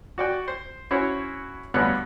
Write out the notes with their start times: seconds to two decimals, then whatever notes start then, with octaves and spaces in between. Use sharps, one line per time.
0.18 F#4 D5 G5
0.48 C5
0.91 C#4 E4 F#4 C5 C#5
1.74 D2 G2 D3 B3 C#5 F#6